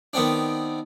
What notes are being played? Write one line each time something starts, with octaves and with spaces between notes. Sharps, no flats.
D#3 B3 C4 D4